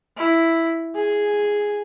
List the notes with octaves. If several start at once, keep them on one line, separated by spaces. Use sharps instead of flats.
E4
G#4